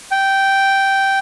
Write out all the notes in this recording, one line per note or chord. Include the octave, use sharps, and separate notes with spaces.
G5